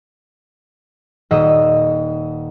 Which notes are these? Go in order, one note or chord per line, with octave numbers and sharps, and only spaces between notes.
D#1 D#5 F#5 E6